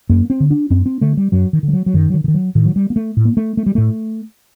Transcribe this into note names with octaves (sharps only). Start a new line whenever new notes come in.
F#2 A#3
C4
D3
D4
F#2 C4
C4
D3 A3
G3
F#2 F#3
D#3
D3
G3
F#3
F#3
F#2 D#3
F#3
D#3
D3
D#3
F#3
A2 D#3
F#3
G3
A#3
A3
A2
A#3
A3
A3
G3
A2 A3